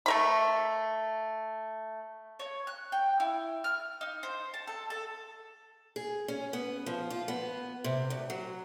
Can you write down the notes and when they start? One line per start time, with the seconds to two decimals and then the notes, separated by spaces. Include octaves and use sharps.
0.06 A3 A#4 B5
2.39 C#5
2.67 F#6
2.92 G5
3.20 E4
3.64 F6
4.01 D#4
4.23 C5
4.54 A5
4.67 A4
4.90 A4
5.96 G#4
6.28 C#4
6.53 B3
6.86 F3
7.10 F4
7.28 B3
7.84 C3
8.10 D2
8.30 F#3